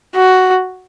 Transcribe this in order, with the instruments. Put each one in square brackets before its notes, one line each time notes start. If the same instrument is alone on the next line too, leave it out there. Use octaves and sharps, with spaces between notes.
[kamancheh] F#4